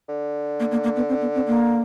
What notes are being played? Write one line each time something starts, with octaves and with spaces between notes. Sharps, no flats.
D3
A#3
A#3
A#3
B3
C4
B3
C4
A#3